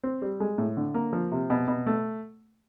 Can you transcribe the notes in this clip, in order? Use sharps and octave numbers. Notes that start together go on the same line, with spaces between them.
C4
G3
G#3
A2
D3
A#3
F3
C3
B2
B2
A3